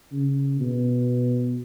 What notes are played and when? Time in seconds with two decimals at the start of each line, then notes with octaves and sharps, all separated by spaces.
0.12 C#3
0.60 B2